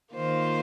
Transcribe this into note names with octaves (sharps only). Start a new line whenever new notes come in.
D#3 A#3 F4 C5